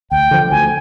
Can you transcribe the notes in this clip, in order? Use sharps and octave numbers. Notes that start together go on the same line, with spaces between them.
D2 G5
D3 F3
D2 G#5